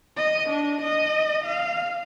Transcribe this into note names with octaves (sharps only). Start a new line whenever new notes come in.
D#5
D4
D#5
F5